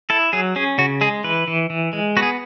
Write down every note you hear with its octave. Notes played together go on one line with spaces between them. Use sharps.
E4 A4
F#3 G#4
C#4 G#4
C#3 F#4
G#3 G#4
E3 B4
E3
E3
G#3
B3 F#4
G#4